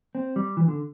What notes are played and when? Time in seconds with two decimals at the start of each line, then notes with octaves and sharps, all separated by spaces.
0.15 C4
0.36 G3
0.57 E3
0.68 D3